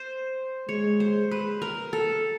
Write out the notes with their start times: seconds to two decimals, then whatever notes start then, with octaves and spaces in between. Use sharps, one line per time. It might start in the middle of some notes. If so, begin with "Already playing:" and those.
Already playing: C5
0.69 G#3 C#5
1.00 C5
1.31 B4
1.62 A#4
1.93 A4